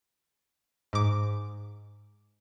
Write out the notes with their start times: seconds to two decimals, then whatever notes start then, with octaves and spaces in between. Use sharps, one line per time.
0.93 G#2 D6